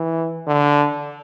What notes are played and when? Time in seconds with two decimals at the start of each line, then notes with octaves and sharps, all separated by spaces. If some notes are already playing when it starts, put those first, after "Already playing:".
Already playing: E3
0.47 D3